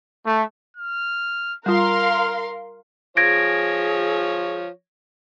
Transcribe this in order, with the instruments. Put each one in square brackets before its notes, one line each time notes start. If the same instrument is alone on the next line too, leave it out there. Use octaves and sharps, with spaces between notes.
[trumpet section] A3
[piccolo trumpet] F6
[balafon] G3 F4 [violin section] A#4 F5 C6 [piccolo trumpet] F6
[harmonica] F3 C#5 [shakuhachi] G#4 [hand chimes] G#6 A#6 D7